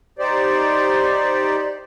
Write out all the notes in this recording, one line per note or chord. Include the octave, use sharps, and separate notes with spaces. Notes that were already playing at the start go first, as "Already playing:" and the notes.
D#4 G4 C5 D5